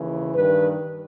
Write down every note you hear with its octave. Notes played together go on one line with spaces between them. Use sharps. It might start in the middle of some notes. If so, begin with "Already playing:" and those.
Already playing: D#2 C#3 E3
G2 D#3 B4